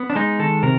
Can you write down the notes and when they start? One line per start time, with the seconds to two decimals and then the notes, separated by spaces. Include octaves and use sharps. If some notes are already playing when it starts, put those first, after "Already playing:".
Already playing: B3
0.10 D4
0.16 G#3 D#4
0.39 D#3 A4
0.63 C3 A#4